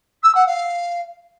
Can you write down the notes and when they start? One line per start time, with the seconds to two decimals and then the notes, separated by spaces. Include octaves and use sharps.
0.23 E6
0.35 F#5
0.46 F5